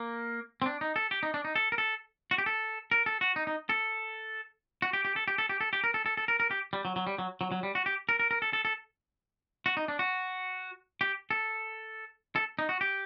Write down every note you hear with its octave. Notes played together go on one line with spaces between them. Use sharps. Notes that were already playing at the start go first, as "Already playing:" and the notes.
Already playing: A#3
C4
D4
D#4
A4
G4
D#4
D4
D#4
A4
A#4
A4
F#4
G4
A4
A#4
A4
F#4
D#4
D#4
A4
F#4
G4
G4
A4
G4
A4
G4
A4
G4
A#4
A4
A4
A4
A#4
A#4
G4
G3
F#3
F#3
G3
F#3
F#3
F#3
G3
F#4
G4
A#4
A#4
A#4
A4
A4
A4
F#4
D#4
D4
F#4
G4
A4
A4
D#4
F#4
G4